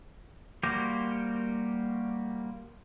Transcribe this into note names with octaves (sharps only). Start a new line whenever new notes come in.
G3 A#3 F#4 G4 C5